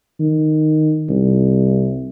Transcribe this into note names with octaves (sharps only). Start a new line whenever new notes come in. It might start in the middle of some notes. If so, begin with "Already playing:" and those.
D#3
C2